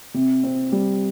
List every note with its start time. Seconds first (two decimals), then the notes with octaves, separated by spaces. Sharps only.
0.14 C3
0.43 C4
0.72 G3